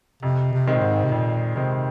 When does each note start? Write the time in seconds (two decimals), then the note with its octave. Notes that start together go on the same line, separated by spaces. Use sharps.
0.23 F2 C3
0.53 C3
0.67 D#3 G#3 C4
0.75 A#2
0.82 G#2
1.04 C3
1.11 F2 A#2
1.56 C3 D#3 G#3 C4